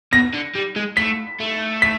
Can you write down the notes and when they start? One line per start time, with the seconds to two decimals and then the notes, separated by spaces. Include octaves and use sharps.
0.13 B2 A#6
0.34 D3
0.55 G3
0.76 G#3
0.97 A3 B6
1.40 A3
1.82 B6